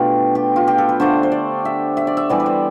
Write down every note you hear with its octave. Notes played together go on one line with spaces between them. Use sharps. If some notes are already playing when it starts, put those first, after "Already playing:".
Already playing: B2 A3 D4 F4 G4
G4
F4
G4
A4
B4
D3 A3 D4 C5
C5
D5
E5
E5
D5
E5
E3 G3 B3 D5
B4
C5